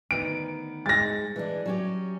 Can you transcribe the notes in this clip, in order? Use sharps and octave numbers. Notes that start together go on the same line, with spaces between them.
D2 D#3 B3 D7
G#2 G#3 A6 A#6
E3 G#3 D4
F#3 C#4 G4